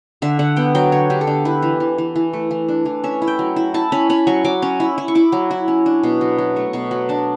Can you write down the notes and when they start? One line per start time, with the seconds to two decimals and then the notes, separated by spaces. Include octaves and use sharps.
0.22 D3 E5
0.39 D3 F#5
0.56 B3 G5
0.75 F#3 G5
0.92 D3 C#5
1.10 D3 G4
1.21 A4
1.27 D3 G4
1.45 E4 B4
1.62 E3
1.80 E3
1.98 E3
2.16 E3
2.33 A3
2.51 E3
2.68 D4
2.86 E3
3.04 C#4 E5
3.22 E4
3.27 G5
3.39 F#3
3.56 E4
3.74 E4 A5
3.92 C#4 B5
4.10 C#4 B5
4.27 F#3 C#6
4.45 F#3 D6
4.62 C#4
4.80 E4
4.98 E4
5.08 C#6
5.15 E4 D6
5.32 F#3
5.51 E4
5.68 C#4
5.86 D4
6.03 B2
6.21 F#3
6.38 F#3
6.56 A3 C#6
6.73 B2 C#6
6.91 F#3 B5
7.09 D4 A5